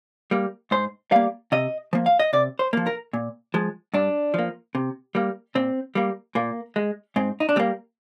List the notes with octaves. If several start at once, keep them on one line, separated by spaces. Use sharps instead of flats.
G3 A#3
G#2 C5
G3 A#3 F5
C3 D#5
F3 A#3
F5
D#5
C3 D5
C5
F3 A#3
A#4
A#2
F3 G#3
G2 D4
F3 A#3
C3
G3 A#3
A#2 C4
G3 A#3
A#2 A#3
G#3
G#2 C4
D#4
D4
G3 A#3 C4